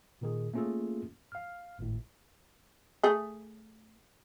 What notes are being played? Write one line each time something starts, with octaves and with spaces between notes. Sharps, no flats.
A#2 D#3 G#4
A3 A#3 C#4 F4 G#4 A4
F5 F6
G#1 A2
A3 G#4